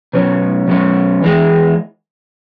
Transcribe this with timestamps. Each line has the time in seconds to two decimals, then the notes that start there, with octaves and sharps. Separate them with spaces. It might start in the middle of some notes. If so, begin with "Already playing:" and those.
0.13 B2 F#3 C#4
0.67 B2 F#3 C#4
1.22 E2 E3 G#3